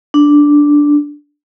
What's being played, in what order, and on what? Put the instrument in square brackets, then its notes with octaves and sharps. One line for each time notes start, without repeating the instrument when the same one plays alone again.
[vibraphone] D4